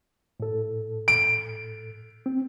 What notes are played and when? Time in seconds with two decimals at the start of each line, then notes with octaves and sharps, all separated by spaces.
0.40 A2 A4
1.08 D7
2.26 C4